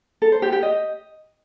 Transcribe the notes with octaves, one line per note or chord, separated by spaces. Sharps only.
A4
C5
G4
G4
D#5